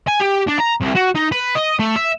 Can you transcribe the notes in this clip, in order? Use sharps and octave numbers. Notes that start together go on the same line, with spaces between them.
G#5
G4
D4
A#5
C2
F#4
D#4
B4
D#5
A3
E5